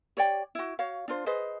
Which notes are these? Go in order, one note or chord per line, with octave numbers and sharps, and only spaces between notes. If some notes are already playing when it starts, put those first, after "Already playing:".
G4 C#5 D5 G5
E4 F#4
F#4 C#5 F5
D4 F4 C5
G#4 B4 C5 D#5